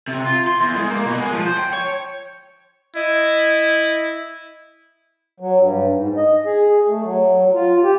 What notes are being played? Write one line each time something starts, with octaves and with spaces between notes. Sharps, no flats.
C3
F4
C6
E2
G#3
A#3
B2
G#3
F3
C5
G5
C#5
E4 D#5
F#3
G2
G#2
D#5
G#4
A3
F#3
F4
G4